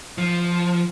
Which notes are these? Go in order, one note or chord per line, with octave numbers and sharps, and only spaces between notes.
F3